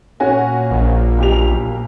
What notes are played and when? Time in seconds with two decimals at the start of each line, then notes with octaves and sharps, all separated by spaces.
0.20 A#2 A#3 C#4 F#4 G#5
0.71 A#1
1.18 B1 G4 F7